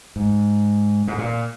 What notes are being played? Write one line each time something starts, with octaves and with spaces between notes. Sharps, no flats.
G#2
G#2
A#2